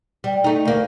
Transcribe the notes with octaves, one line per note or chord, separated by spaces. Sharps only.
G3
A3 D#4
D2 A#3